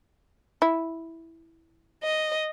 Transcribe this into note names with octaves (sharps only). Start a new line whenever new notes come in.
E4
D#5